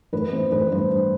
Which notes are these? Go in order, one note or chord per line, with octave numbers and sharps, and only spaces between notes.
A1 B4
E3 C5
A1 B4
G2 C5
G2